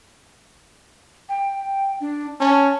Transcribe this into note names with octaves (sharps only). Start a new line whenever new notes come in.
G5
D4
C#4 A5